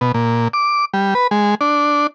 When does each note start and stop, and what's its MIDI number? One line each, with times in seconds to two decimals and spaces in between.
0.01 0.12 47
0.14 0.48 46
0.53 0.85 86
0.94 1.14 55
1.15 1.27 71
1.31 1.55 56
1.61 2.07 62